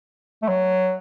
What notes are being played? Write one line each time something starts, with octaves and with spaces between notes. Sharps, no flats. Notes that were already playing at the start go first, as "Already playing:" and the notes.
A3
F#3